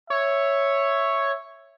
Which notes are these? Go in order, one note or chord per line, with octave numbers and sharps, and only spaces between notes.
C#5 E5